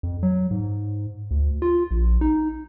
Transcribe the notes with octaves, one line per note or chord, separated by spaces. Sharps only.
F2
F#3
G#2
D2
F4
A#1
D#4